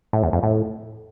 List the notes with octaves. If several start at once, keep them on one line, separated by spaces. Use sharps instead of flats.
A2
E2
F2
A2